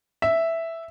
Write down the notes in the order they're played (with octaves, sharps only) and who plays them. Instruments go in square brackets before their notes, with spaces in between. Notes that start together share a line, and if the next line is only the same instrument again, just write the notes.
[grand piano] E5